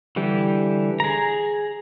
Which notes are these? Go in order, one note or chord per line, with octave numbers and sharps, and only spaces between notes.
D3 E3 G3 G4
G#4 A#5